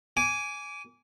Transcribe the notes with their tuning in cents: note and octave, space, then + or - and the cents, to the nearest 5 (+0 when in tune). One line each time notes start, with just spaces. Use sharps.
G#5 +0 D6 -25